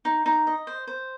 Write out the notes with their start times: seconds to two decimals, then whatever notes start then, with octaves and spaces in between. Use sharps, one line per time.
0.05 D#4
0.26 D#4
0.47 D#5
0.67 C5
0.87 C5